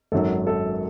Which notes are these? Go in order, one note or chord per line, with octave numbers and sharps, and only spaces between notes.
G#1 F#2 D#3 F#3 A4
A4